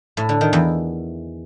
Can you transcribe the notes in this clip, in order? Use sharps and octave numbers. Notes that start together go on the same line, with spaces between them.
A2
D3
D#3
E2